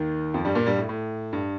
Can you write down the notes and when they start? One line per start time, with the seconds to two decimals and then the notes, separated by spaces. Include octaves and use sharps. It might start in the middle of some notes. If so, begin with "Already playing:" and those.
Already playing: D#2 D#3
0.34 F2 F3
0.45 G2 G3
0.55 A#2 A#3
0.66 G2 G3
0.79 A2
0.89 A2
1.33 G2